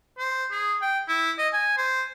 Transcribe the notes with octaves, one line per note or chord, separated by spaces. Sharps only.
C5
G#4
G5
E4
D#5
G#5
C5